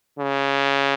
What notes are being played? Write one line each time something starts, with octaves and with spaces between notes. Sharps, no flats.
C#3